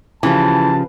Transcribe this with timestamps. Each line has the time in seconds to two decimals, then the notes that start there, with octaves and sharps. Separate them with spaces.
0.23 C#3 E3 F3 G4 A5